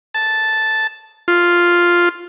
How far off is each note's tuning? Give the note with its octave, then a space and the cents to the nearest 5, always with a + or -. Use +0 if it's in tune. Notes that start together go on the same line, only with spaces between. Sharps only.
A5 -5
F4 +0